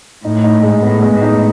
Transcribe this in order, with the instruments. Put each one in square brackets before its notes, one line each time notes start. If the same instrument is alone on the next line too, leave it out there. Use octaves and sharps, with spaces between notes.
[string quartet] A2 [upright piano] D#4
[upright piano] D#4
G#3
[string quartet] A2 [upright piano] B3
[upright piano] G#3
[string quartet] A2
[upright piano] D#4